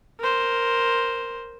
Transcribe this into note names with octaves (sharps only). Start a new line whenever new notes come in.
A#4 C5